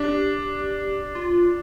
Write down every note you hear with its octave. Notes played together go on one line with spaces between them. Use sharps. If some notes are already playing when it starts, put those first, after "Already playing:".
Already playing: D4 G4
F4